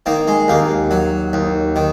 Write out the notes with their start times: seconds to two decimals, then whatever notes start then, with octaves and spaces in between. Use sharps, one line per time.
0.06 D#3 A#3
0.28 G#3
0.48 D#2 A#3
0.91 F#3
1.33 D#2
1.76 D#3